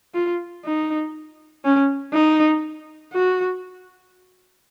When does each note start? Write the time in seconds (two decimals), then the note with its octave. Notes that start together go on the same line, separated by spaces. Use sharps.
0.14 F4
0.65 D#4
1.64 C#4
2.14 D#4
3.13 F#4